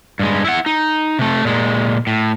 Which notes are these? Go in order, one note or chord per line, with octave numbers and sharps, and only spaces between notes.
G2 G#3
E4 F#5
D#4
C3 A3
A#2 G#3
A2